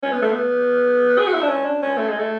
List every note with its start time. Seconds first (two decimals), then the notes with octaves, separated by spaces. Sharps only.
0.03 C#4
0.12 B3
0.22 A3
0.32 B3
1.19 G#4
1.27 F#4
1.34 E4
1.42 D4
1.49 C#4
1.65 D4
1.82 C#4
1.98 A3
2.09 G#3
2.19 A3